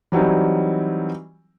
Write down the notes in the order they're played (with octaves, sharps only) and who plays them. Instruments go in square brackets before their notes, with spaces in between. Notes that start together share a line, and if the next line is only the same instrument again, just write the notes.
[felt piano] E3 F#3 G3 C4 D#4